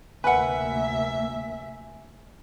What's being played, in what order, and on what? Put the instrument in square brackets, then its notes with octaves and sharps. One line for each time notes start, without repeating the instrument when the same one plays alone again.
[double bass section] F1 D2 A#3 [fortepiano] B4 F#5 [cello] E5 [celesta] G#5